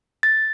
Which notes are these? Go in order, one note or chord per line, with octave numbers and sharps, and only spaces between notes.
A6